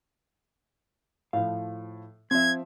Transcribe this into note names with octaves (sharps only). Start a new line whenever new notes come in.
A2 F3 F5
F3 C4 E5 G#6